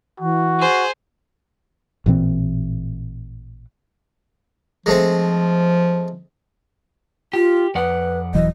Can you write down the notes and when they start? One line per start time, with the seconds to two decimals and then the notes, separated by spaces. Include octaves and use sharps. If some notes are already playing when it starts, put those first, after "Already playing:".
0.20 E3 F#4
0.60 G#4 C5
2.06 A1 A#2 E3 C4
4.86 F3 G#3 A3 C4
7.33 F4 G4
7.75 F2 B4 D5 F#5
8.34 D#1 E3 F#3 D#5